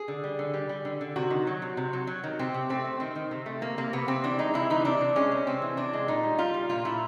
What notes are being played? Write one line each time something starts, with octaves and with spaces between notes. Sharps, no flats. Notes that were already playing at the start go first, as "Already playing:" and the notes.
Already playing: G#4
D3
G3
D3
G3
G3
D3
D3
C3 F#4
D#3
F#3
C3
C3
F#3
F#3
D#3
C3 C4
C3
A3 C4
A3
D#3 C4
D#3
C3
A3
C3 A#3
C3 A#3
C3 B3
C3 C4
E3 D4
G#3 D#4
C3 E4
E3 D#4
C3 D4
C3
G#3 C#4
C3
C3 C4
E3
C3 D4
G#3
A#2 D#4
G3
G3 F4
G3
A#2 F4
A#2 E4